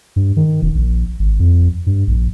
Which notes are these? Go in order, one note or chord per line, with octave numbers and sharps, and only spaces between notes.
G2
D#3
E1
A#1
G#1
F2
G2
A#1